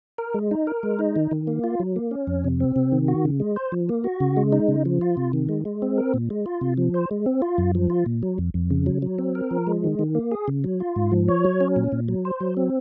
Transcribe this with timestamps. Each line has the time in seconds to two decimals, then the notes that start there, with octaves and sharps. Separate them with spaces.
0.18 A#4
0.34 G#3
0.51 D#4
0.67 A#4
0.83 G#3
0.99 D#4
1.16 D#3
1.31 D#3
1.47 A#3
1.64 F4
1.80 F#3
1.96 A#3
2.11 C#4
2.27 F2
2.44 C3
2.60 C4
2.76 C3
2.92 D#3
3.08 F#4
3.25 C#3
3.40 G#3
3.56 C5
3.72 F3
3.89 A#3
4.04 F#4
4.20 C#3
4.37 G#3
4.52 D#4
4.68 C#3
4.85 F3
5.01 F4
5.17 C3
5.33 D#3
5.49 G#3
5.65 G#3
5.82 C4
5.98 A#4
6.14 A#2
6.30 G#3
6.46 F4
6.61 C3
6.78 F3
6.94 C5
7.11 G#3
7.26 C4
7.42 F4
7.58 F#2
7.75 F3
7.90 F4
8.06 A#2
8.23 F#3
8.38 F2
8.54 F2
8.71 C#3
8.86 F#3
9.02 F#3
9.19 C4
9.35 A#4
9.51 F3
9.67 G#3
9.84 D#3
9.99 D#3
10.15 A#3
10.32 G#4
10.48 C#3
10.64 F#3
10.80 F4
10.96 G#2
11.11 F3
11.28 C#5
11.45 F#3
11.60 C#4
11.76 A#2
11.92 A#2
12.08 F#3
12.25 C5
12.40 F#3
12.57 C4